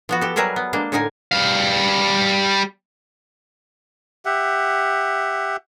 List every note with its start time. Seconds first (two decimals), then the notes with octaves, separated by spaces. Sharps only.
0.09 F3 B3 F#4
0.21 G4 A4
0.36 F#3 G3 G#4 A#4 B4 E5
0.56 B3
0.73 G#3 A#3 D4
0.92 A2 D3 D#4 A#4 G#5
1.32 G3 F5
4.25 G4 E5 F#5